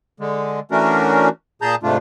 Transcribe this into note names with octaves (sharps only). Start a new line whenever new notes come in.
D3 G#3
E3 A3 C#4 D4 F#4 A#4
A#2 G#4 A5 A#5 E6 G6
G#2 C3 A3 D4 F4